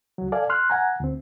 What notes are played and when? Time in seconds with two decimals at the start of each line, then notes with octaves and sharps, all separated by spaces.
0.18 C#2 F#3
0.32 A4 D5 F5 G#5
0.50 C6 F6 F#6
0.70 F#5 G#5 A#5
1.00 D2 C4